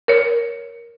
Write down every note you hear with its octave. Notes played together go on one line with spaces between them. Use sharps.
A#4 C#5